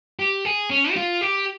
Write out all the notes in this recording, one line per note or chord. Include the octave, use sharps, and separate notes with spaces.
G4
G#4
C#4
G4
F4
G4